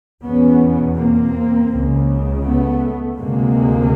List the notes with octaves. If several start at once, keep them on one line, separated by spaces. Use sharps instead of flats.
E2 B2 B3 C#4
A#3 C4
C#2 C#3
A3 B3
D2 C3 G#3 A#3